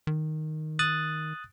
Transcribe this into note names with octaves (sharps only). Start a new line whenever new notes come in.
D#3
D#6 F#6 A6